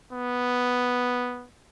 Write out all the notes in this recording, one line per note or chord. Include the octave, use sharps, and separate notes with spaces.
B3